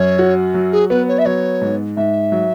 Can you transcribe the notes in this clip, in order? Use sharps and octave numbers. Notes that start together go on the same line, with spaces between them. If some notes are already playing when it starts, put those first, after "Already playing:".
Already playing: F#2 C#5
F#4
F#3
G#4
B3 B4
C#5
E5
F#3 C#5
G#2
G#2 E5
F#3